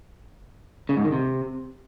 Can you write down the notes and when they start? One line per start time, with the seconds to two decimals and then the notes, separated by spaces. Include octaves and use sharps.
0.89 C#3
0.97 G#2
1.05 D#3
1.12 C3